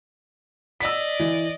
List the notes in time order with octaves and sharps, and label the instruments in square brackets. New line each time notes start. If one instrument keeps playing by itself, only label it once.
[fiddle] D5 D#5 [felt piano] E6 B6
[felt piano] E3